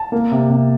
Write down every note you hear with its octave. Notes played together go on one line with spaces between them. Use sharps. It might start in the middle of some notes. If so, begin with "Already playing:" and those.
Already playing: A5
A#3
C3
C3